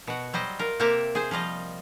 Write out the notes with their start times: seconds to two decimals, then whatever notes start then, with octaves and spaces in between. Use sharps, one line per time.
0.07 B2 F#4
0.33 F#3 G3 C5 D#5
0.59 F4 A#4
0.79 C3 A#3 G4 A4 A#4 E5
1.15 G#4 C5
1.31 F3 G3 F4 D#5